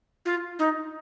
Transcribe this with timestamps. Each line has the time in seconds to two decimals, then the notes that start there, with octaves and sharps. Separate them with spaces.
0.25 F4
0.59 D#4